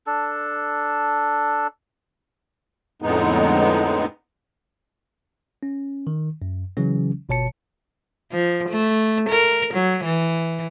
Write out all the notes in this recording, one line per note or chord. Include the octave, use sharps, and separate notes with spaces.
D4 A4
F2 A2 D3 G#3 B3 D#4
C#4
D#3
F#2
C#3 E3 F#3 C#4
G1 B2 C#5 A5 C#7
F3
A3
A#4
F#3
E3